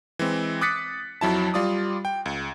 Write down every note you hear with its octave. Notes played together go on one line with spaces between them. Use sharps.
E3 G#3 C4
D6 D#6 F#6 A6 B6 C#7
F2 F#3 E4 A5
G3 F4 D5 D#6
G5
C#2